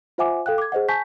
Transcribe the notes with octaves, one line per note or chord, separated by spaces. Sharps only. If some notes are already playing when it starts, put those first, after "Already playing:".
F4 C5 E5 F#5 G#5 D6
A4 F5 G5 F#6
D6 G#6
G#4 C5 D#5 F#5
G#5 A5 C#6 G6 B6